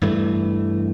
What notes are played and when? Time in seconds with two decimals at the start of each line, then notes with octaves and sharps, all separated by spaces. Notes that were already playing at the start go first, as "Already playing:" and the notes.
0.02 G2 E3 A3